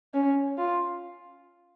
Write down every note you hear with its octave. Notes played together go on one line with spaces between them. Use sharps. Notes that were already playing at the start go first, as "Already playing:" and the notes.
C#4
F4